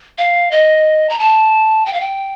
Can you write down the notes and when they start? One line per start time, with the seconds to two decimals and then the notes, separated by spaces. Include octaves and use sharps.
0.18 F5
0.51 D#5
1.10 A#5
1.19 A5
1.86 G5
1.93 F5
2.00 G5